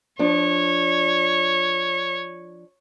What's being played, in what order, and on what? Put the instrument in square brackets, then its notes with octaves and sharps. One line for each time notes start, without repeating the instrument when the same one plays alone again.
[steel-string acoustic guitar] F3 D4 [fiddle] C#5